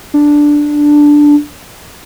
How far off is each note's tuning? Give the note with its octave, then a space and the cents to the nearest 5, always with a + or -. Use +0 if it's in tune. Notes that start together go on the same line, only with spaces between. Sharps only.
D4 +0